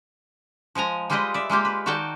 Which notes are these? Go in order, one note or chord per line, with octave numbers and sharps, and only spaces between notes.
F3 G#3 G#5 A#5
G3 G#3 F4 G4 B4 D#5
D5 E5
G#3 A#3 F4 G4
B4
D#3 F#4 A#4 D5 G5 A5